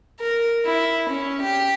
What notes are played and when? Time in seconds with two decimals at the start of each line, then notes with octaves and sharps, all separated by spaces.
0.20 A#4
0.67 E4
1.10 C#4
1.43 G4